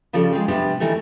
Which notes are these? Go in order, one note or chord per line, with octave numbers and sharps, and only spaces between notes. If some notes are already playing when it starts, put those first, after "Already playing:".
C#3 F3 G3 A4 D5
G#3 C4
C3 G3 B3 D4
D#3 E3 G3 A3